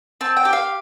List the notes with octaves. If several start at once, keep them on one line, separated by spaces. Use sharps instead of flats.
C4 A5
G5
G4
F5